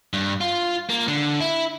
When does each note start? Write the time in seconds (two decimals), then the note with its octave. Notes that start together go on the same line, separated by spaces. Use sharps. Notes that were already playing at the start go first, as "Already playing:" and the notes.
0.13 G2
0.41 F4
0.89 A#3
1.08 D3
1.40 E4